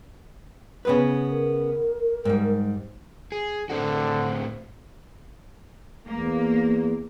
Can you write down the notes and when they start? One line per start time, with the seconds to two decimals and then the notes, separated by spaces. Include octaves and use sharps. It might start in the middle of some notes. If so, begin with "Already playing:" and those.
0.85 C#3 B3 B4
1.31 A#4
2.25 G#2 G3
3.32 G#4
3.70 A2 D3 C4 F#4
6.07 E2 A#3